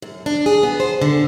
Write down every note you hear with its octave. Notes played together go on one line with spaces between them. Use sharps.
F#2
D4
G#4
B3
C5
D3